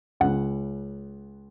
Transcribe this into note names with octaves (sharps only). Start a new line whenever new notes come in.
C#2 C#3 F#5